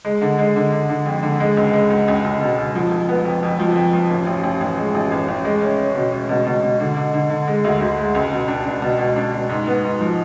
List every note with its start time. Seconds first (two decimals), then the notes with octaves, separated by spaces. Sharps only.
0.05 G#3
0.21 D3
0.39 G#3
0.56 D3
0.72 D3
0.89 D3
1.06 F2
1.23 D3
1.40 G#3
1.57 C#2
1.73 G#3
1.90 C#2
2.08 C#2
2.24 C#2
2.41 B2
2.58 C#2
2.75 F3
2.91 F1
3.09 B3
3.25 F2
3.43 F2
3.59 F3
3.76 F2
3.93 F3
4.09 A1
4.27 A1
4.43 A1
4.61 A1
4.78 G#3
4.95 A1
5.12 A1
5.28 A1
5.45 G#3
5.62 C#4
5.79 C#4
5.95 B2
6.12 C#4
6.29 B2
6.47 B2
6.63 B2
6.80 D3
6.97 D3
7.14 D3
7.30 D3
7.48 G#3
7.64 D2
7.81 D2
7.97 G#3
8.15 C#2
8.32 B2
8.48 D4
8.66 D4
8.82 B2
8.99 B2
9.16 D4
9.33 B2
9.49 G#2
9.67 B3
9.84 G#2
10.01 F3